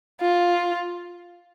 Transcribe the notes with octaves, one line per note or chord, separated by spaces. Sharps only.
F4